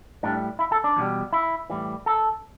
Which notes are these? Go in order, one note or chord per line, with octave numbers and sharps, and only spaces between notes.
A2 G3 D4
E4
A4
D4
E2 B2 G3
E4
A2 E3 G3
A4